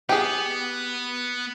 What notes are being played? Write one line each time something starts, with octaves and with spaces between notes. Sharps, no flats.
B3 G4 G#4